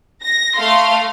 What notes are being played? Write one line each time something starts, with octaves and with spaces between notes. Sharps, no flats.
A#6
A3 F5 C6